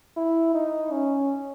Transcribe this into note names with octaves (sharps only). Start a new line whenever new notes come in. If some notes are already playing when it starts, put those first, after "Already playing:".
E4
D#4
C#4